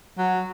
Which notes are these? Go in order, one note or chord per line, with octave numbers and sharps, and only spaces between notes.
F#3